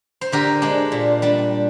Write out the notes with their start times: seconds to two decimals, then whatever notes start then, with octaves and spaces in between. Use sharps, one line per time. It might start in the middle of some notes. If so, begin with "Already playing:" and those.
0.21 C5
0.32 D3 G4 A#4
0.62 G#3 D4
0.92 A#2
1.22 G3 D4